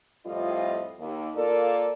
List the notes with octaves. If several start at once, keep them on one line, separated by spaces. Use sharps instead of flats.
F2 A2 G3 F4 D#5
D#2
A#3 F4 A4 A#4 D5